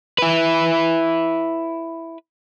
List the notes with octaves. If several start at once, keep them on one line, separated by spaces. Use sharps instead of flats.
E4 B4